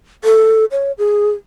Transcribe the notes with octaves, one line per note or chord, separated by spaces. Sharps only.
A4
C#5
G#4